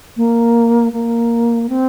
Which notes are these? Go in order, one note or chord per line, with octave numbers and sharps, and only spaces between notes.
A#3
A#3
C4